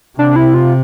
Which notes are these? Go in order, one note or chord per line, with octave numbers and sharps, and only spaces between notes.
C3 D4
E4
F4